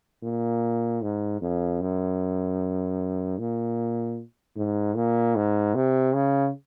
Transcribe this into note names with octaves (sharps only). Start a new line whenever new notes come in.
A#2
G#2
F2
F#2
A#2
G#2
A#2
G#2
C3
C#3